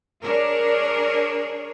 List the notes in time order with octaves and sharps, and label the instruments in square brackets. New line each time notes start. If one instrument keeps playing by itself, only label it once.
[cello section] D4 G#4 A#4 C#5